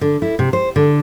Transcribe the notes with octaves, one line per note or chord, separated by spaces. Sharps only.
D3
E4
C3
C5
D3